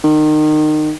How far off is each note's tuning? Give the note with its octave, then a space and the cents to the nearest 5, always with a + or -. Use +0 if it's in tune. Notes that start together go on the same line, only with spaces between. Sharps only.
D#3 -25